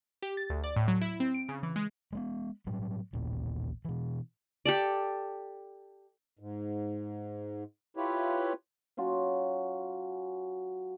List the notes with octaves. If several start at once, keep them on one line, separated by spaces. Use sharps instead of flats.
G4
A6
D2
D5
A2
F#3
E4
C4
D7
C#3
E3
G#3
G#3 A3 B3
A2 F#3 G3
A1 D#2 A#2
B2 E3
G4 A4 D5
G#2
E4 F4 G4 B4 C#5
F#3 C#4 F4 F#4